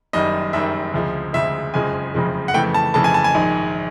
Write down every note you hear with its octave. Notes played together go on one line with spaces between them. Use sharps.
F#1 F#2 D#3 G3 D#5
F#1 F#2 D#3 G3 E5
D2 C#3 F3 G#3
D2 C#3 F3 G#3 E5
F#1 F2 C#3 F3 G#3 G#5
F#1 F2 C#3 F3 G#3
F#5
F2 C#3 E3 A3 G5
A5
F2 C#3 E3 A3 A5
G#5
A5
G#5
A#1 G#2 D#3 G#3